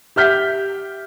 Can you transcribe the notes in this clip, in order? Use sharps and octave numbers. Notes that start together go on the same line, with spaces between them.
G4 E5 F6 G6 B6